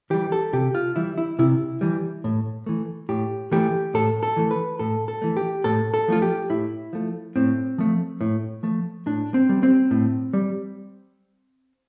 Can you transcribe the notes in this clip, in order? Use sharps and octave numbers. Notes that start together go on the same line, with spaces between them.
E3 G3 G4
A4
C3 G4
F4
E3 G3 E4
E4
C3 E4
E3 G3
A2
E3 A3
A2 G4
E3 A3 G4
A2 A4
A4
E3 A3
B4
A2 A4
A4
E3 A3
G4
A2 A4
A4
F3 A3 F4
G4
A2 E4
F3 A3
A2 C4
F3 A3
A2
F3 A3
A2 D4
C4
G3
C4
A2
G3